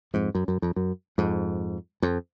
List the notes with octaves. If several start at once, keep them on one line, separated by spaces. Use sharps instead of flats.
F2 G#2
F#2
F#2
F2
F#2
F2 G#2
F2